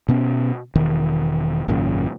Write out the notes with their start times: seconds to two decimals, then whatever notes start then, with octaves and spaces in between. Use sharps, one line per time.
0.08 B2 B3 C#4
0.75 E1 D#3
1.68 G#1 F#2 A#2 C#3